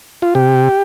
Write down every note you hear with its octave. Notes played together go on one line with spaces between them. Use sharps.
F4
C3 G4